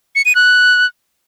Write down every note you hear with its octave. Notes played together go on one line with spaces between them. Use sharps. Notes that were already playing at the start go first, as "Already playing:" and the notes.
C#7
D#7
F#6